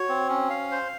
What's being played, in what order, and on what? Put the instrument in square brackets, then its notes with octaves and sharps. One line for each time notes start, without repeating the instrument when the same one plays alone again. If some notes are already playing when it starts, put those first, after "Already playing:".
Already playing: [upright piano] F#4 [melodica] C#5
[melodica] C4
C#4
F5
C5